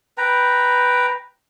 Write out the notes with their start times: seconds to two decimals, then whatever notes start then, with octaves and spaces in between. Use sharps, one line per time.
0.18 B4 G5 A#5